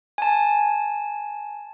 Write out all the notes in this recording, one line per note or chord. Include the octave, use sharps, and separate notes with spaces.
G#5 A5